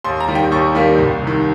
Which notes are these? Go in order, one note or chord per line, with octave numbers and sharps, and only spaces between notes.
D#2 C6
A#5
D#3 G3 A#3
G5
D#2 C#6
D#3 G3 A#3
C2
C3
D#3